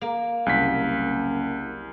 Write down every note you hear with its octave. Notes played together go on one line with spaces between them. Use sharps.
A#3
F#1 C2 B6